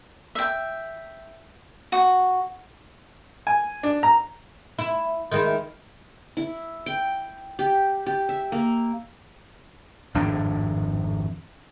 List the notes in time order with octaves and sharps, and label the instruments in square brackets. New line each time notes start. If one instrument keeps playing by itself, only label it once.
[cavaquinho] E5 G5
F#4
[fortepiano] G#5
D4
A#5
[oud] E4
D#3 G#3 E4
[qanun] E4
G5
G4
G4
E5
A#3
[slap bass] G#1 F2 A2 D4